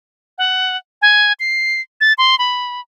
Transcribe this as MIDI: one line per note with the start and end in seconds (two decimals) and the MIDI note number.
0.38 0.77 78
1.02 1.33 80
1.40 1.81 96
2.01 2.13 93
2.18 2.38 84
2.39 2.81 83